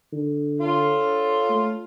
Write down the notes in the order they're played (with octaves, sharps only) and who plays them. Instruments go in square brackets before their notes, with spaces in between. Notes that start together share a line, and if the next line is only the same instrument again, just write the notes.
[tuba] D3
[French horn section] D4 A4 C#5 [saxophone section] F4
[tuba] A3